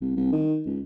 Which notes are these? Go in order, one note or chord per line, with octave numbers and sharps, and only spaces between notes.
C2
C2
D#3
C#2